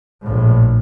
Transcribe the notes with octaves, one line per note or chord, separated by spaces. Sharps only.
A#1 A2